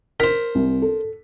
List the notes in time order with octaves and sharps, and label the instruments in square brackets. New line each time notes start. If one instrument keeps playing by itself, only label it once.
[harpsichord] A#4 C5 [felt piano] B6
[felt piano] C2
A4